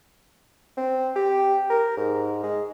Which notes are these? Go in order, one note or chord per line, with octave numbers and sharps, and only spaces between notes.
C4
G4
A#4
G#2
G#3